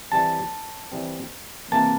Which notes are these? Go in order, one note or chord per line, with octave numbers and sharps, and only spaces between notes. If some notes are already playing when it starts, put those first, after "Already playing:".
E3 G3 C4 A5
E3 G3 C4
C3 E3 A#3 A5